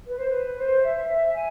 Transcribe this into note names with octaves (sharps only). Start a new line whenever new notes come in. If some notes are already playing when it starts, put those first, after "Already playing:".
B4
C5
B4
C5
E5
E5
G#5